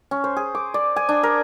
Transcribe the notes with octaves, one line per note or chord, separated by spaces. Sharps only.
C#4
C5
G#4
D6
D5
G#5
D4
A#4